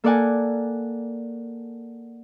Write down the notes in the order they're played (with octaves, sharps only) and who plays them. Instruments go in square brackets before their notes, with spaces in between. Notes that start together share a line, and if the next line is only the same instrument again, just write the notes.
[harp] A#3 A4 A#4 D5 F#5 G#5